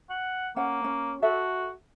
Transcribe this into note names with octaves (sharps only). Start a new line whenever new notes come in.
F#5
A#3 C#4 F#5
C#4
F#4 A4 E5